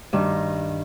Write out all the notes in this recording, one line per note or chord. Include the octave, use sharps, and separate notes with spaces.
G2 D#3